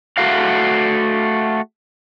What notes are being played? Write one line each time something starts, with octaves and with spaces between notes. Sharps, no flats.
A3 F#4 F5